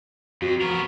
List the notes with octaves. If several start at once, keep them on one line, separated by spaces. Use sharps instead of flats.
F2 F#4
B3 A#4 C#6